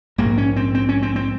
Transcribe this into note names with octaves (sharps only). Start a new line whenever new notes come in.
A#1 G#2 A#3
C#4
C4
C4
C#4
C4
C4